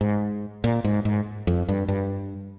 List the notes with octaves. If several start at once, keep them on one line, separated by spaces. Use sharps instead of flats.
G#2
A#2
G#2
G#2
F2
G2
G2